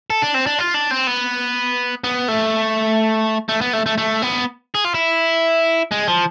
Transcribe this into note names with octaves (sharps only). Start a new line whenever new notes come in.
A4
D4
C4
D4
F4
D4
C4
B3
B3
A3
A3
B3
A3
A3
A3
B3
G#4
F4
E4
G#3
F3